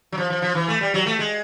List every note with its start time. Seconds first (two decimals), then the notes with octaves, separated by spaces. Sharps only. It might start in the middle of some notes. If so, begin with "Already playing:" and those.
0.12 F#3
0.18 F3
0.30 F3
0.42 F3
0.55 E3
0.68 A3
0.81 G3
0.94 F#3
1.06 A3
1.19 G#3